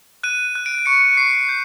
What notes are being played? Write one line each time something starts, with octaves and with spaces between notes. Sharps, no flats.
F#6 D#7
F#6
D7
C#6 C#7
C#6 C7
G6